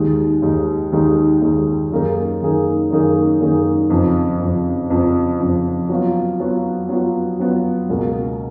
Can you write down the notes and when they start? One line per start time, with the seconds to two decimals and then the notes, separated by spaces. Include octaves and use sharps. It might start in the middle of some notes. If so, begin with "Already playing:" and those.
Already playing: D#2 D#3 G#3 D#4
0.42 D#2 D#3 G#3 D#4
0.92 D#2 D#3 G#3 D#4
1.41 D#2 D#3 G#3 D#4
1.91 F#2 D#3 A#3 D#4 G#4
2.41 F#2 D#3 A#3 D#4 G#4
2.90 F#2 D#3 A#3 D#4 G#4
3.41 F#2 D#3 A#3 D#4 G#4
3.90 F2 C#3 F3
4.40 F2 C#3 F3
4.90 F2 C#3 F3
5.39 F2 C#3 F3
5.89 F#3 B3 F4
6.40 F#3 B3 F4
6.89 F#3 B3 F4
7.39 F#3 B3 F4
7.89 C#2 B2 A#3